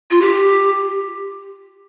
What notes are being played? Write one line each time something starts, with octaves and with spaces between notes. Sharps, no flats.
F4
G4